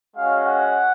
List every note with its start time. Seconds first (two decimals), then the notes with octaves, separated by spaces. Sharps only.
0.16 G#3 C#4 F#4 F5
0.46 F#5